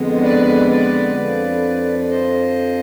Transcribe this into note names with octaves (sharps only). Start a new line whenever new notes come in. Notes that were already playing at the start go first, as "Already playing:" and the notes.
Already playing: F2 D3 G#3 B3
B4 D5
B4 D5
F2 D3 F3
D5
C5 D#5